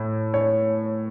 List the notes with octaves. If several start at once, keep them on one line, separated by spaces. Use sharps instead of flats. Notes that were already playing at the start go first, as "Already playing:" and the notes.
Already playing: A2
C#5